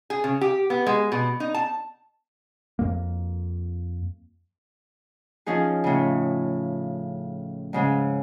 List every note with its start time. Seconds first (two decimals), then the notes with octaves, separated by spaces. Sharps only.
0.10 G#4
0.24 C#3
0.41 G4
0.70 B3
0.86 G#3
1.12 B2
1.40 D#4
1.54 A5
2.79 F2 A#3
5.46 F3 C#4 D#4 G#4
5.84 A2 C#3
7.73 G#2 C#3 G#3